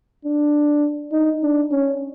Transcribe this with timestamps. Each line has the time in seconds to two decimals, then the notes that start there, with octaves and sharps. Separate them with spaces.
0.25 D4
1.12 D#4
1.43 D4
1.71 C#4